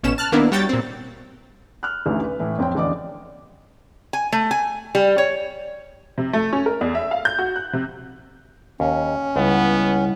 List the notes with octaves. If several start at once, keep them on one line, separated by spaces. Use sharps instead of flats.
A1 B2 C#4 E7
A5 F6 F#6
D#3 A#3 B3 D4 E4
G3 F#4 C#5 G5 A6
A#2 C4
F6 F#6
A1 D2 E3 A3 D#4
B4
A2 E3 A3
F2 C4 C#5 G5
A1 E2 D3 D5 D#5 D6
G#5
A3
G#5
G3
C#5
C3
A3
C#4
A#4
E2
E5
F5
G6
F#4
F#6
C3
D#2 C#4
C#2 G3 B3 E4 F#5